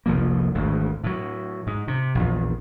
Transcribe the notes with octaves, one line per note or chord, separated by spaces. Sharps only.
F1 C2 F3 A#3
G#1 D2
A2 F#3
G#2
C3
A#1 E2